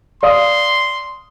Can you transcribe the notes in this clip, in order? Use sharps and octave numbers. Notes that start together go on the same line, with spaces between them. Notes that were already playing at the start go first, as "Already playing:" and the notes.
D5 F5 C6 D#6